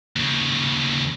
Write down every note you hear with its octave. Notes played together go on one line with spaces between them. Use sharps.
D#2 C#3